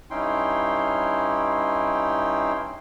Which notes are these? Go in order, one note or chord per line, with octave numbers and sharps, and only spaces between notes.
G2 C#4 D#4 E4 G5 C6